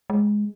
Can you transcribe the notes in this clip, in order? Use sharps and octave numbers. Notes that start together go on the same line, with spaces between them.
G#3